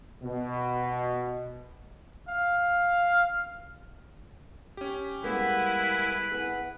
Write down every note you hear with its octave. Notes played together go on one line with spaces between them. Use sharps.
B2
F5
C#4 G4
G3 G#3 A#3 B3 E4 B4
B3 E4 G#4